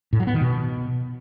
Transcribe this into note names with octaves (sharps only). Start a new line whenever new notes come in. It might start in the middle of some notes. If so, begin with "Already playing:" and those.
A2
F#3
B3
D#3
B2